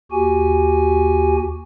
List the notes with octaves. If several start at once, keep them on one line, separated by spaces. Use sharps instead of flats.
D#2 F#4 G4 G#5